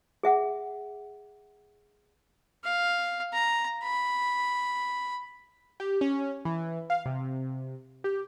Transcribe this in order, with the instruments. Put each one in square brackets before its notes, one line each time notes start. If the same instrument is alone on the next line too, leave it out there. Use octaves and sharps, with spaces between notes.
[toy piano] G#4 E5 F#5
[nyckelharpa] F5
A#5
B5
[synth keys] G4
C#4
E3
F5
C3
G4